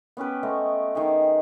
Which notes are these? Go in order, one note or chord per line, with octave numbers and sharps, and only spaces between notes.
B3 C#4 G4 B4
A3 B3 C5 D#5
D#3 G4 G#4